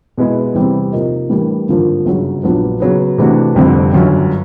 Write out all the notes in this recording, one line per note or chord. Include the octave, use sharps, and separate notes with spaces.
B2 G#3 B3 E4 G#4
E2 C3 E3 G3 C4
C3 F3 A#3 D#4
A2 E3 G3 A#3 D4
G#1 G2 D3 F3 A#3
G1 F#2 C#3 F#3
A#1 A#2 F#3 B3 D4
C#3 F#3 B3
C3 E3 A3 D4 F#4
F1 F2 D3 G3 C4
G1 F#2 D3 F#3